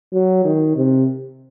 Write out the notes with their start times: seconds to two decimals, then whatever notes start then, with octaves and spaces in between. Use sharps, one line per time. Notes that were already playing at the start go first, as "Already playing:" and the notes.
0.14 F#3
0.45 D#3
0.77 C3